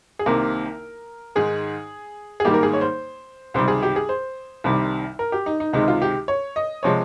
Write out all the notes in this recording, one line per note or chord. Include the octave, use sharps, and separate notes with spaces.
G#4
C2 C3 D#3 A#3 A#4
G#2 D#3 G#3 G#4
G#4
G#2 D#3 G3 A#3 G4
A#4
G#4
C#5
C5
C#2 C3 D#3 G3 C5
G#4
G4
G#4
C5
C2 C3 D#3 G3
A#4
G4
D#4
D#4
C#2 C3 D#3 G#3 D#4
F4
G4
C#5
D#5
C3 F3 G#3 C#5